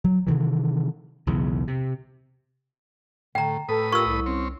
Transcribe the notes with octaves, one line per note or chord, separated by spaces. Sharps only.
F#3
C3 D#3 E3
B1 E2 C#3
C3
A2 D3 G5 A#5
A2 A4 B4 D#6
F4 G4 A#4 C#6 E6
C2
C4 C#4